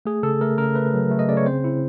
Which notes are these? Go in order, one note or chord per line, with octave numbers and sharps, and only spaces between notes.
A3 G#4
C#3 A4
A3 A#4
C#3 A#4
A3 B4
F#3
A3
D#5
C#3 D5
C#5
C4 C5
E4